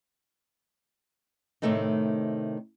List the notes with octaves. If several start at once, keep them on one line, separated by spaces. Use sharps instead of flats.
A2 C3 D#3 A3 C4 D#4